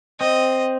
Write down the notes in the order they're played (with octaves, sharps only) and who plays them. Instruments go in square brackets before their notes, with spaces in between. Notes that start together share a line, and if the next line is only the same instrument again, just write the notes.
[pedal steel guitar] C4 [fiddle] D#5